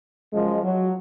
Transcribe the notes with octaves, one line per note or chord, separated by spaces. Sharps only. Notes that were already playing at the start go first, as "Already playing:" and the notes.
F#2 C#3 F3 G#3
F#3